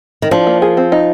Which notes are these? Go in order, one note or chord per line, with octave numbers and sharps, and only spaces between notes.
D#3
F3 D4
A#3
G#4
C4
D#4